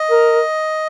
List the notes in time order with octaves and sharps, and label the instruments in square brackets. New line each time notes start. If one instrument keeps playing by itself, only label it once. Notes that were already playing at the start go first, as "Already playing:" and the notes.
Already playing: [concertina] D#5
[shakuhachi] A#4